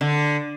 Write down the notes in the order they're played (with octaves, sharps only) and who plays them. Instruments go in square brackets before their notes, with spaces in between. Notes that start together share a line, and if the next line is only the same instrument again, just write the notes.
[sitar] D3